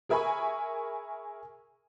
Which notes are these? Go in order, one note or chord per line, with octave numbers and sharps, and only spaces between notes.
G#4 A#4 E5 G#5 B5 C#6